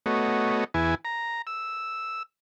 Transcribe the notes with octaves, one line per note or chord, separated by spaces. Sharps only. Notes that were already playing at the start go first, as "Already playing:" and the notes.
A3 B3 F#4 C#5 D#5
E2 E4 B4 G#5
A#5
E6